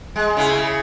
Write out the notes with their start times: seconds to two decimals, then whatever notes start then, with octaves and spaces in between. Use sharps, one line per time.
0.16 G#3
0.37 C#3 E4